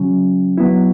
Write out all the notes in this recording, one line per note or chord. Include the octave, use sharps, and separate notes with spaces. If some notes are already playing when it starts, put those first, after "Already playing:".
Already playing: C#3 F#3 C#4
F#3 B3 E4